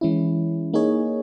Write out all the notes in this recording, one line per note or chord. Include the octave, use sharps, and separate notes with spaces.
E3 G#3 C#4 E4
A#3 D#4 G#4 C#5